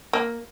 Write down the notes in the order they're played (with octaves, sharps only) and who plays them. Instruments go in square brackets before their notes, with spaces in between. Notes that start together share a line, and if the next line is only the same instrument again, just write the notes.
[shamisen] A#3